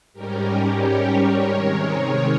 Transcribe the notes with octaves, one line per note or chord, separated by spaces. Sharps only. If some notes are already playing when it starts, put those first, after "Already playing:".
G#2 G3 C#4 G4 A#4
A#4 C#5
C3 D#3 G#3 A#4 C#5